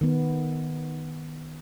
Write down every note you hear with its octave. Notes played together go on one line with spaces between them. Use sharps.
D#3 B3